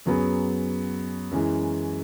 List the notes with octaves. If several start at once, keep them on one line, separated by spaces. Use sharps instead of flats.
F#2 F#3 B3 G#4
F#2 E3 G#3